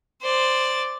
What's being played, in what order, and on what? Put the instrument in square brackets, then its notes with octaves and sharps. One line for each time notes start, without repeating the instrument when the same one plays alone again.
[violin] C5 D5